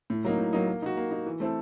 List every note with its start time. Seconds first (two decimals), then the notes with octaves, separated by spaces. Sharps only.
0.10 A2
0.24 F#3 A#3 D#4
0.39 A2
0.53 F#3 A#3 D#4
0.67 A#3
0.82 D#4 F#4
0.97 A#3
1.11 D#4 F#4
1.26 E3
1.40 A3 C4 E4 A4